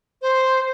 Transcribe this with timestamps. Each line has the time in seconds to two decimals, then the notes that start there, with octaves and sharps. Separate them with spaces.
0.22 C5